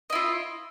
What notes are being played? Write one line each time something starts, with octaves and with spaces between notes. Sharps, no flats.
E4 F4 D#5